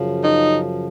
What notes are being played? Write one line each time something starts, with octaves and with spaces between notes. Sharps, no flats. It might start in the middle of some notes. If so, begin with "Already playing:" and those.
Already playing: F#2 C#3 F3
D#4